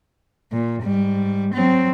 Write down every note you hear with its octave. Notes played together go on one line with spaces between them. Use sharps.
A#2
G#2 G3
F#3 C4